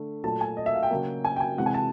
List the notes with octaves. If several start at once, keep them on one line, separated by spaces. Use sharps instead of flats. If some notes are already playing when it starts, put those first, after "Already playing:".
Already playing: D3 A3
A#2 F#3 A3 A5
G#5
D#5
E5
F5
G5
C#3 F#3 A#3
G#5
G5
G#5
C3 E3 G#3 F#5
G#5
A5